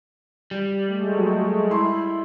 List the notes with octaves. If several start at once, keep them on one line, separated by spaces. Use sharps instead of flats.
G3
G#3 A3
F#3
E4 C6